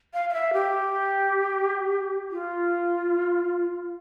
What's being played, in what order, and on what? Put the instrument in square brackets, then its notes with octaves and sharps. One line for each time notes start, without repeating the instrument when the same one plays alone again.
[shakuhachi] F5
F5
E5
G4
F4